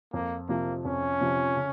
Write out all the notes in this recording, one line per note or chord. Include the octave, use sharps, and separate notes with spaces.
F2 A#3
C3 F3 A#3
F2 C#4
C3 F3
C#3